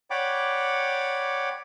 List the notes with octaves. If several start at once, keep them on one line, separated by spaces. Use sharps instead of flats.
C#5 D5 F#5 G5 B5 D6